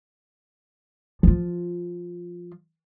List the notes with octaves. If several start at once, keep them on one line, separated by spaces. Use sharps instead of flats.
F3 F4